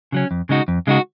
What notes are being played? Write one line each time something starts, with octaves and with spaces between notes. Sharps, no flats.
C#3 F#3 C#4
F2
C#3 G#3 D#4 F#4
F2
C#3 G#3 D#4 F#4